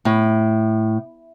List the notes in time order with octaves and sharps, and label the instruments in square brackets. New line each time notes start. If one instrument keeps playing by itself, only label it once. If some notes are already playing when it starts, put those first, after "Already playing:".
[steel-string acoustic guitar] A2